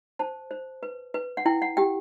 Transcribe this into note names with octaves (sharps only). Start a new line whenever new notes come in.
C5 A5
C5
B4
B4
F#5
E4 G5
F#5
G4 G5